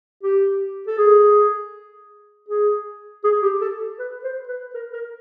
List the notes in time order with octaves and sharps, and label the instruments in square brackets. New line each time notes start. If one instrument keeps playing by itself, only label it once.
[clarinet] G4
A4
G#4
G#4
G#4
G4
A4
B4
C5
B4
A#4
A#4